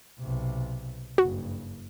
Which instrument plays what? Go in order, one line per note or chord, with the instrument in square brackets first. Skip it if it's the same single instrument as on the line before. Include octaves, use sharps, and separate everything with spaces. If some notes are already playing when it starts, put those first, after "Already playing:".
[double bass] B1 C3
[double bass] F#1 G2 [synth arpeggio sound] F#4